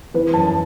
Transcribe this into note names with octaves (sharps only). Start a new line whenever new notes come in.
E3 B4
F#2 A5